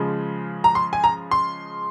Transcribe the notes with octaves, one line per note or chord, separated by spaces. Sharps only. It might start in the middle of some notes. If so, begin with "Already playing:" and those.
Already playing: C#3 F3 G#3
A#5
C6
G#5
A#5
C6